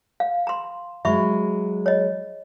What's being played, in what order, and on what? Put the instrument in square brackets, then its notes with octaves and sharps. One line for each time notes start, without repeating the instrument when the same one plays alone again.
[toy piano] F5
A#5 C6
[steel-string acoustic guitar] F#3 G#3 [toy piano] E5 B5 C#6
[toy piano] C#5 D#5